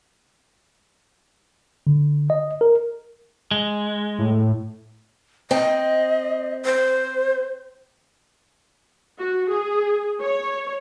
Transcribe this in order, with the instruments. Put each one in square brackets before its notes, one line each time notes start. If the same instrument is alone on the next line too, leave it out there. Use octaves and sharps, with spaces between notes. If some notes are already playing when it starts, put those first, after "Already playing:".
[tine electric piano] D3
D#5
A#4
[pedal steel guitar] G#3
[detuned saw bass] A2
[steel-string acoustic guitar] C4 [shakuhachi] D#5
[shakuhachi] C5
[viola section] F#4
G#4
C#5